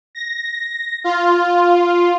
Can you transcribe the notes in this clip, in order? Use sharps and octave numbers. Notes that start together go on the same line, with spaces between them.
A#6
F4